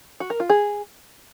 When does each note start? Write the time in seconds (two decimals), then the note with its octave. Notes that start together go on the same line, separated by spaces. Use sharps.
0.20 F#4
0.30 A#4
0.40 F4
0.50 G#4